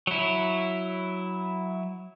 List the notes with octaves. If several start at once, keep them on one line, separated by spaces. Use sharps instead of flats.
F#3 E4